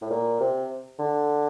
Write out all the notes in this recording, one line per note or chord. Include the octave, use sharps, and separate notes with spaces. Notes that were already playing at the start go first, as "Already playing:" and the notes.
A2
A#2
C3
D3